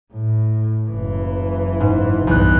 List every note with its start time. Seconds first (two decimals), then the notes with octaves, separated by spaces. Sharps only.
0.13 A2
0.89 F#1 E3
1.80 G#2
2.27 B1 E2 G2 F#6